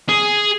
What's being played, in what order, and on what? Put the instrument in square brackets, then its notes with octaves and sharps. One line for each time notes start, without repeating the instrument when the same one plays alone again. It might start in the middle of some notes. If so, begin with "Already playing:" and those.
[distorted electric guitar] G#4